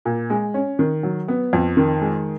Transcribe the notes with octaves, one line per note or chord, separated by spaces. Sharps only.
A#2
G#3
C#4
D#3
F#3
B3
F2
D#3
G#3